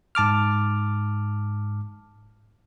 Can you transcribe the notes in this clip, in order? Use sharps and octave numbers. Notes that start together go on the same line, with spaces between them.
G#2 A5 D6 F6